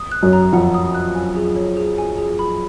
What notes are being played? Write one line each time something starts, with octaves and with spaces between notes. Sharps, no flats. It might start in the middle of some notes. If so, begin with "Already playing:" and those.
Already playing: D#6
F#6
F#2 F#3
A#5
F2 F3 F#5
D#6
F#6
G#5
G#4
C#5
G#4
G#5
G#4
B5